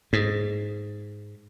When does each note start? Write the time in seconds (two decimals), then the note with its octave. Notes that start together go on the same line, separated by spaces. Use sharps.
0.13 G#2